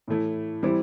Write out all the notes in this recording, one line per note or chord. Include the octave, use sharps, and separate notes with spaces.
A2 E3 A3 E4
E3 G3 C4 E4